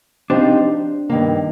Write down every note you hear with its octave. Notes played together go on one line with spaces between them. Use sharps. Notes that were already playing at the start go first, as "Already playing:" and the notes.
F3 C4 D4 D#4 G4 C5
G2 D#3 A#3